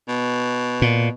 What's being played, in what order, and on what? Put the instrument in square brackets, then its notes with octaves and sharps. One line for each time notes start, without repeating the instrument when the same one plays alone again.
[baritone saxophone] B2
[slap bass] A#2